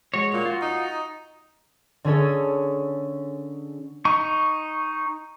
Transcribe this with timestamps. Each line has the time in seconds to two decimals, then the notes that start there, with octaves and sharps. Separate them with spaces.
0.14 G#3 F#4 C#5
0.33 A#2
0.45 F4 F#4
0.61 D#4
2.04 D3 C#4 G#4 A4 C#5
4.05 D#4 C#6